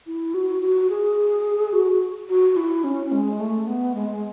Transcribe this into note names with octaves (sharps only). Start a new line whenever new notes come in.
E4
F#4
F#4
G#4
F#4
F#4
E4
C#4
G#3
A3
B3
G#3